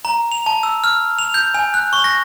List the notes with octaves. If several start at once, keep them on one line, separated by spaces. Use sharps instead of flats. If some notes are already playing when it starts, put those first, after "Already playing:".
A#5
F7
A5
E6
F6
F7
G6
G#5
F#6
C#6
A#6